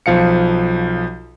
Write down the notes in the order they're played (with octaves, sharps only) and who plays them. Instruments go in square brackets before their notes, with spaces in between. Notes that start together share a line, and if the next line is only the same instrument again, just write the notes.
[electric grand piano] B1 F3 F5 C#7